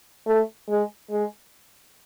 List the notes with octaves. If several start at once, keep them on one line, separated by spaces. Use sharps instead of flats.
A3
G#3
G#3